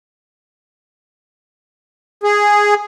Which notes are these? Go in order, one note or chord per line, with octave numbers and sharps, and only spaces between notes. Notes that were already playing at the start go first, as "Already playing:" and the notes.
G#4